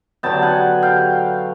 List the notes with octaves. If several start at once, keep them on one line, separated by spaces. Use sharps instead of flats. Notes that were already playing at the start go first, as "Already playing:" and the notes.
D3 F#3 B3 G5 A5
F#5 G#5
F5 G5